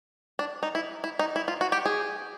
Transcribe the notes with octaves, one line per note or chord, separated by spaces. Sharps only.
D4
D#4
E4
E4
D#4
E4
F4
F#4
G4
G#4